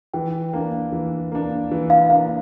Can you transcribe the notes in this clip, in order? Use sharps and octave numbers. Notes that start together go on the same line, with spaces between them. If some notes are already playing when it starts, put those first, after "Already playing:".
E3 G5
A#3 D4
E3
A#3 D4
E3
F5
A#3 D4 F5